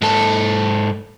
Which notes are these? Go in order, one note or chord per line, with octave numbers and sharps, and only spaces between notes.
G#2 A4